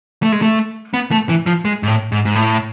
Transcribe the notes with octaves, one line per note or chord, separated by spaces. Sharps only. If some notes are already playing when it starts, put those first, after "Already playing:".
A3
G#3
A3
B3
A3
E3
F3
G#3
G#2
A2
G#2
G#2
A2